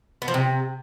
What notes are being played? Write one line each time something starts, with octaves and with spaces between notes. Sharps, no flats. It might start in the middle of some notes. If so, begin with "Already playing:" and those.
B3
F3
C3